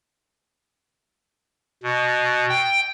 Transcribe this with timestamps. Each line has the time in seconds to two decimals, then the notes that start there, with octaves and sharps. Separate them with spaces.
1.83 B2
2.49 G5